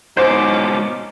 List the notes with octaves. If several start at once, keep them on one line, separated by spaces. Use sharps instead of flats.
G#2 B2 C#4 D#4 C5 D6